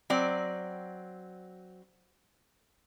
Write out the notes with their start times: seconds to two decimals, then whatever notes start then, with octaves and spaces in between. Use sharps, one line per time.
0.10 F#3 C4 D5